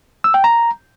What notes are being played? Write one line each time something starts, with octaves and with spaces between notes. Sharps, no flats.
E6
G5
A#5